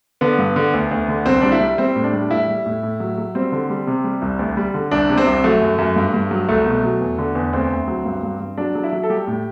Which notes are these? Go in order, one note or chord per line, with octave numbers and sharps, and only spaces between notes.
D3 B3
G2
D3
D2
D2
D3
C2 C4
G3 D4
E4
G3
G3 C4
A2
D4
G3
A2 E4
G3
A2
A2
F#3
F#3
G3 C4
D3
G3
C3
G3
C2
D2
G3
D3
C2 D4
C3
C4
C2
F#3 A3
F#2
F#2
G2
G2
F#3
C2 A3
B2
F#3
E2
D3
E2
D2 C4
D2
F#3
G2
G2
G2
F#3 D4
F#3
E4
F#3
A4
G3 G4
A2